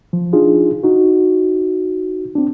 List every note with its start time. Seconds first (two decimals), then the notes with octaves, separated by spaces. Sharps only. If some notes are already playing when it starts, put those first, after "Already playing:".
0.13 F3
0.33 D4 D#4 F4 G#4
0.84 D#4 F#4
2.35 C4 D4